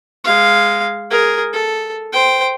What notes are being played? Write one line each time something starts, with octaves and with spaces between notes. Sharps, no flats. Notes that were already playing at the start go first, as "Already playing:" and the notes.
G#3 F5
G#4 A#4
A4
C5 G5